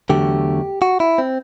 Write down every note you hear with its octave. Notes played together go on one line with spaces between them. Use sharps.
E2 D3 F#3 A3 G4
F#4
E4
C4